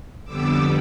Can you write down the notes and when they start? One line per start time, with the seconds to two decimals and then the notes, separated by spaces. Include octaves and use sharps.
0.25 F2 D3 G3 B3 D6 E6